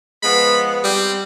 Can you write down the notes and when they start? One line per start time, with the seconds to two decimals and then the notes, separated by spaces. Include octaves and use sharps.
0.23 F3 G#3 B3 B5
0.84 G3 C4